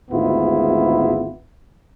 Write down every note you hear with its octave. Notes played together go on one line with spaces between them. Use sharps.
G#1 D2 G#2 B3 E4 F4